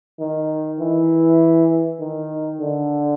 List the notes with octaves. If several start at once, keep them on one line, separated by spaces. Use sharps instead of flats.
D#3
E3
D#3
D3